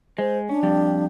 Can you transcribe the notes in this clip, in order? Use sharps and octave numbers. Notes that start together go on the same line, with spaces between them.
G#3 C5
C#4 D4
F2 G3